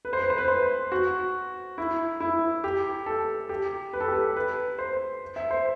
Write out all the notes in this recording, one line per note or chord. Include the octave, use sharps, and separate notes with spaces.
B4
C5
B4
C5
B4
C5
F#4
E4
E4
G4
A4
G4
B4
A4
G4
A4
B4
C5
E5
C5